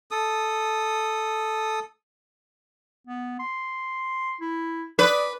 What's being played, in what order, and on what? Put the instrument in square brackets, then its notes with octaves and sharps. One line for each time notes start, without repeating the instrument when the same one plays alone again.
[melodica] A4 D#6
[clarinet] B3
C6
E4
[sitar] B4 [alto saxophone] D5 [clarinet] D#6